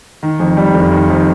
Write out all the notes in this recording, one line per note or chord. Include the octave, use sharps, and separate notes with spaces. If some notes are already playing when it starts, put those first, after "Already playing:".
D#3
F2
G3
F1
D#3
F2